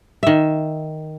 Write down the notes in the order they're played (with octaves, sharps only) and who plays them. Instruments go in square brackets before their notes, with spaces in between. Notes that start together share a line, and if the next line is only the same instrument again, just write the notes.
[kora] D#3 E5